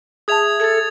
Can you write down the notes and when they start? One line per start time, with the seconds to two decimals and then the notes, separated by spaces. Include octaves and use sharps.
0.28 G#4 E5 A5 D#6 G#6 F7
0.60 A4 G#6 A6